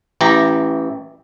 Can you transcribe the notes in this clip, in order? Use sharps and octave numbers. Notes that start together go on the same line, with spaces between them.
A1 E3 G4 A#5